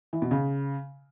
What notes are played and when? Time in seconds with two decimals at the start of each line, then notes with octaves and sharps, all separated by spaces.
0.13 E3
0.22 B2
0.31 C#3